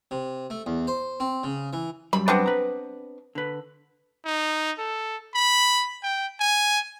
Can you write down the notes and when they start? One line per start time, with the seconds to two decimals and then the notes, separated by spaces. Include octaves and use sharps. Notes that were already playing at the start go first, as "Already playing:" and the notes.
0.11 C3
0.50 A3
0.66 E2
0.87 C5
1.20 C4
1.44 C#3
1.73 E3
2.13 F#2 G3 B5
2.28 B3 C4 D4
2.46 B4 A#5
3.35 D3 B4
4.26 D#4
4.78 A4
5.35 B5
6.03 G5
6.40 G#5